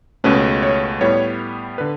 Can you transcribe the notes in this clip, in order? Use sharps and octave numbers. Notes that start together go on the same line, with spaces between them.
C#2 B2 A3 C#4 B4
C#5
A2 G3 B3 C#5
D3 B4